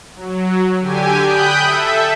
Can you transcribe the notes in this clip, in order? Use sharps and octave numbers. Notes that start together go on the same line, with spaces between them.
F#3
D3 G4 G#5
G5 B5 D#6 F#6 G6
A4 E5